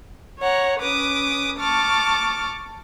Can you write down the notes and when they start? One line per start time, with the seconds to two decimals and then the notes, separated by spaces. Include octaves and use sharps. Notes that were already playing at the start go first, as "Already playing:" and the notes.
0.40 C#5 F#5 A#5
0.79 C#4 B4 D6 D#6
1.59 A5 C#6 D6 F6